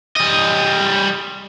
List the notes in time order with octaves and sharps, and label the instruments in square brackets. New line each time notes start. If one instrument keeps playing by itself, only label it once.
[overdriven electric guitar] G3 D#5